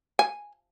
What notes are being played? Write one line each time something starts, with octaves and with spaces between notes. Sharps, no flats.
G#5